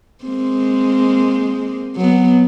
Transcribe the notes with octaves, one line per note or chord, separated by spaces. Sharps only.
G#3 A#3 C4
F#3 B3